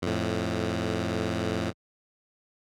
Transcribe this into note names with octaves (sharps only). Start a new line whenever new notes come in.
F2 A2